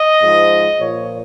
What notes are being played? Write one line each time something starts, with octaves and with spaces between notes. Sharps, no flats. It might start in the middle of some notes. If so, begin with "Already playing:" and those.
Already playing: D#5
G#2 F3
A#2 F3 C#5